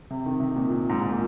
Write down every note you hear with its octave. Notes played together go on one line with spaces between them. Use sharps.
C3
D#3
C3
A#2
A#2
G#2
G#2
A#2